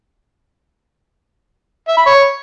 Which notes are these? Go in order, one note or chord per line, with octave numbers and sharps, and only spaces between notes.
E5
B5
C#5